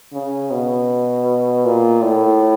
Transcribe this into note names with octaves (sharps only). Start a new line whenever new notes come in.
C#3
B2
A#2
A2